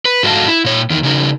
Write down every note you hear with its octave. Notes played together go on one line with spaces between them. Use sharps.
B4
G#2 F#4 A4 D#5 F5 A5
E4
A#2 C#5
E2 D#3
C#3 D#4 F#4 A4 A#4